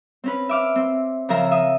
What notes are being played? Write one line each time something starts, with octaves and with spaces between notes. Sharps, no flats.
C4 C#4 B4
E5 D6 F6
C4
C#3 F3 F4 A#4 E5 A#5
E5 D#6